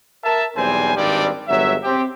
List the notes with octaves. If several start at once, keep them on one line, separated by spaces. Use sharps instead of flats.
A#4 E5 A5
B1 E2 G3 C4 C5 G#5
G#1 G2 D#3 G3 C4 D5
G1 F#3 G#3 E5
C4 G4